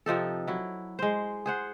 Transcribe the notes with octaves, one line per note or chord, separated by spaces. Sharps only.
C3 F3 D#4 A4
F#3 E4
G#3 C5
G#4 C5 F#5